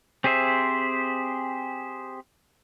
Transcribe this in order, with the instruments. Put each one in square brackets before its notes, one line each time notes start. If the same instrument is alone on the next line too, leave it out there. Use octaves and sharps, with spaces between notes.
[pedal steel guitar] C4 G4 G#4 C5 E5